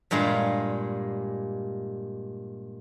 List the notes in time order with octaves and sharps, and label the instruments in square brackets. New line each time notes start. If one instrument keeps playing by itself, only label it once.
[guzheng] G2 A#2 G#3 F5